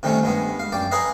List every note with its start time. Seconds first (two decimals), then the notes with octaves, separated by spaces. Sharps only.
0.03 C3 D#3 G3 A3 C#4
0.23 G2 G#3 B3
0.59 F5
0.72 F#2 D5 G5
0.91 G#4 A#4 B4 C#5 D#5 F5